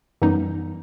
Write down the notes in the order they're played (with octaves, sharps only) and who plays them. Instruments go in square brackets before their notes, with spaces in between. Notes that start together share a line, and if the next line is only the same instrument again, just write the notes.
[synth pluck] F#2 E3 G3 B3 D#4